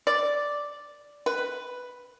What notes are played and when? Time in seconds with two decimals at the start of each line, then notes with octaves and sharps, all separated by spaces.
0.07 D5
1.26 B4